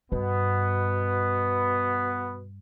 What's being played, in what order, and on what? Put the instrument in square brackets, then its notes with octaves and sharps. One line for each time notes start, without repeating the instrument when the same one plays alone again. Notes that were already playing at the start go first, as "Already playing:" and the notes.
[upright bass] G2 [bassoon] B2 [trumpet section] B3